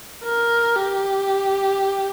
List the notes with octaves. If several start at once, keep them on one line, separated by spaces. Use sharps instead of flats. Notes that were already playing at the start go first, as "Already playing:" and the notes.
A#4
G4